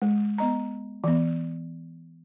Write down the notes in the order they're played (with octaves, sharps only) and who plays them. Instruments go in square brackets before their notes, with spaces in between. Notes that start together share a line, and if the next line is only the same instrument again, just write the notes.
[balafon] G#3
B3 D#5 A#5
E3 B3